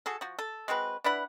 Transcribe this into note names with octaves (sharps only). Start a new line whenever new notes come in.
F#4 G#4 A4
F3 F#4
A4
G#3 C4 F#4 B4
D4 E4 B4 F#5